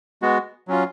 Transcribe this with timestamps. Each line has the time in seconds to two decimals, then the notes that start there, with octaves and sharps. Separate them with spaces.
0.22 G#3 B3 F#4
0.68 F#3 C#4 F4